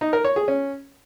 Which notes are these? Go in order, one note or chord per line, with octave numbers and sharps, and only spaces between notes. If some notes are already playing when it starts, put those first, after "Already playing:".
D#4
A#4
C#5
G#4
C#4